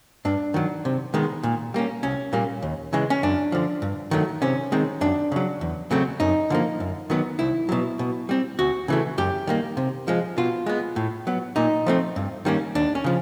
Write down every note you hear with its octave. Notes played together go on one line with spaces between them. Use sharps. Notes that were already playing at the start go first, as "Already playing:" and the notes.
G2 D4
D#3 F#3
C3
D#3 G#3 B3
A#2
G3 A#3 C#4
C2 C#4
A#2 G3 A#3
D#2
C#3 E3 G#3
C#4
F#2 D4
D3 F3
G2
D#3 F#3 A3
C3 C#4
D#3 G#3 C4
F#2 D4
C#3 F#3
E2
C#3 F#3 A3 C4
F#2 D#4
D3 F3 A#3
F#2
D#3 F#3 B3
C2 E4
B2 F#3
B2
G3 C4
D2 F#4
C#3 E3 A3
F#2 G4
D#3 G3 A#3
C3
F3 G#3
B2 F4
G#3 B3
A2
F#3 B3
A#2 D#4
F3 A3 C4
G2
D#3 G3 A#3 C#4
D#2 D4
C#4
C#3 F3